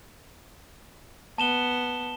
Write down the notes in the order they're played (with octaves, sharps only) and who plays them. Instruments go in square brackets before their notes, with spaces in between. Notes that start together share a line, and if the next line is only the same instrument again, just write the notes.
[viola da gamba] B3 [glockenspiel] A5 E7 G7